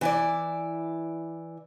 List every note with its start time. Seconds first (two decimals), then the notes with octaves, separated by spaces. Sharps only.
0.01 E3 E4 D5